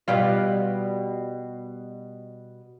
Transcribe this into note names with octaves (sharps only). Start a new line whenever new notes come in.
B2 G3 F4